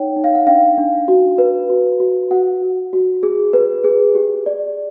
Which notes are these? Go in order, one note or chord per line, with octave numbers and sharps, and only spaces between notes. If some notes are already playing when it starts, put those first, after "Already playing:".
Already playing: D#4 C#5 F#5 G5
D#4
F5
F#5
D4 F5 G5
D4
F#4
B4
F#4
F#4
F#4 F#5
F#4
F#4
G#4
B4
G#4
G4
D5